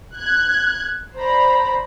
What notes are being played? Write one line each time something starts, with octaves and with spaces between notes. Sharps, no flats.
F#6 G#6
C5 D5 A#5 B5